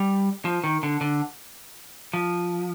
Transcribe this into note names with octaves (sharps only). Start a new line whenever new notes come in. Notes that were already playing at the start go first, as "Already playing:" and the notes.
Already playing: G3
F3
D#3
D3
D3
F3